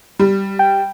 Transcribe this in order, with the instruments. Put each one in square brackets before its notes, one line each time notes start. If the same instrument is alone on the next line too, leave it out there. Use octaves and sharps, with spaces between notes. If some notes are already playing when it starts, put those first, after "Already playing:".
[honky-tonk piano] G3
[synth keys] G5